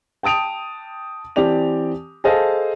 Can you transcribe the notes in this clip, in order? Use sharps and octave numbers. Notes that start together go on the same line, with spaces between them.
G5 A5 D#6 D7 F7
E3 C4 G4 D5 A5 F7
G#4 A4 C5 D#5 F5 A5